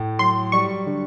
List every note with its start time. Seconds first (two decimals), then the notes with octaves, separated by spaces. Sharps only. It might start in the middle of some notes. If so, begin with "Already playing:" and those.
Already playing: A2 A3
0.19 F#3 C6
0.52 G3 C#6
0.87 D3